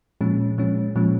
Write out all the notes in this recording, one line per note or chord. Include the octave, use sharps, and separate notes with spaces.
A#2 F3 G#3 C#4
A#2 F3 G#3 C#4
A#2 F3 G#3 C#4